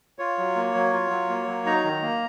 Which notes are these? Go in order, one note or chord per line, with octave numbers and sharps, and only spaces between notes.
F4 C#5
F#3
A#3
F#3
F4
F#3
A#3
F#3
D#4 A#5
D#3
A#3